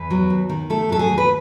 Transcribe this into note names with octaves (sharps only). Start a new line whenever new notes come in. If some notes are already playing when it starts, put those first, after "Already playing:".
Already playing: E2 B4
F#3
D#2
D#3
A3 A4
F#3 A4
G#4
D#2
B4